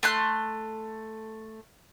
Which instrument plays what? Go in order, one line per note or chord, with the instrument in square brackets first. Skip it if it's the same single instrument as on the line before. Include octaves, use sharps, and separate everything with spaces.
[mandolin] A3 C6 F#6